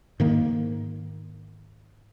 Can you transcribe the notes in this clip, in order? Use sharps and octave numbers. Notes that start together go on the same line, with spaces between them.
G#2 D#3 A#3